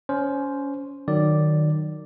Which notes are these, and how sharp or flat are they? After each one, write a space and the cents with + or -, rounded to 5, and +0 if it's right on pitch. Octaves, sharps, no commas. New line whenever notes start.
C#4 +20 C5 +0
D#3 -25 F#3 +0 D5 +0